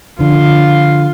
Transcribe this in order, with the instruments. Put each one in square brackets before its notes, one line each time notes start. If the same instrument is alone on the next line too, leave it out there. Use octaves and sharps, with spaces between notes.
[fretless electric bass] D3 F3 [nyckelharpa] F4